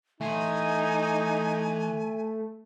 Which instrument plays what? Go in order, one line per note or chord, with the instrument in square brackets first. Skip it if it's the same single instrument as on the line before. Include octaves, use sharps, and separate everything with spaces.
[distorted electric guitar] E3 C6 [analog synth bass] A3 [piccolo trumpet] D#4 [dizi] G#5